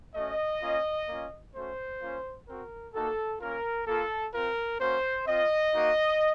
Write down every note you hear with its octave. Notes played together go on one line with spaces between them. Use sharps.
A3 C#4 F#4 D#5
A#3 C#4 F4
A#3 C#4 F4
A3 C#4 F#4 C5
A#3 C#4 F4
C4 F#4 A#4
A#3 D#4 F#4 A4
A#3 C#4 F4 A#4
A#3 F4 A4
C4 F4 A#4
A#3 C#4 F#4 C5
C4 F4 D#5
A#3 D#4 F#4